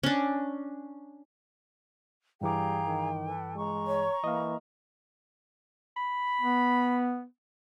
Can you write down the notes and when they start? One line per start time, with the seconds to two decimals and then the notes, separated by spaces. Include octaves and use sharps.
0.03 C#4 D4
2.41 G2 E3 G3 G#4 F5 G5 A#5 D6
2.86 D#3
3.26 A4 B4
3.55 G#3 A#5 C#6
3.87 C#5
4.24 E3 A#3 D#5 F5
5.97 B5
6.41 B3